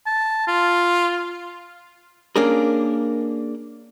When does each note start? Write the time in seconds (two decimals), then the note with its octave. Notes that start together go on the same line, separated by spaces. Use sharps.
0.06 A5
0.47 F4
2.36 A#3 C#4 D4 G#4 A#4